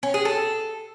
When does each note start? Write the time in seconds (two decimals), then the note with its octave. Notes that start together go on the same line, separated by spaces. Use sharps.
0.03 C#4
0.14 G#4
0.25 A4